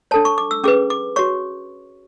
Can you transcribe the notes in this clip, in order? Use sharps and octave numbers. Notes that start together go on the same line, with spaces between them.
D4 A4 C#5 A5
C#6
D6
E6
C#4 G#4 B4 D6
D6
F#4 C#5 C#6